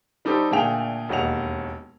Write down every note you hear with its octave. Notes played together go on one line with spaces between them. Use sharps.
G3 D#4 G4 A4 C5
A#2 D3 A3 G#4 G5 F7
E1 D#2 D#5 F#5 F7